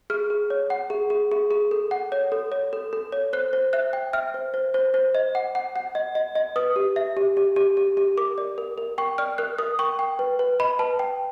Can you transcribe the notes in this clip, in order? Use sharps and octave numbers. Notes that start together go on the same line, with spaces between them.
G#4 F6
G#4
C#5
F#5
G#4
G#4
G#4
G#4
A4
F#5
C#5
A4
C#5
A4
A4
C#5
C5 F#6
C5
E5 F#6
G5
E5 F6
C5
C5
C5
C5
D#5
F#5
F#5
F#5
D#5
D#5
D#5
B4 D#6
G4
E5
G4
G4
G4
G4
G4
A#4 D6
D5
A#4
A#4
G5 C#6
D5 F6
A#4 F#6
A#4 D#6
G5 C#6
G5
B4
B4
D#5 B5
B4 A5
G5